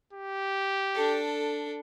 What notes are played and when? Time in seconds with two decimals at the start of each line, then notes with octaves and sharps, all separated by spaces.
0.13 G4
0.94 D4 A4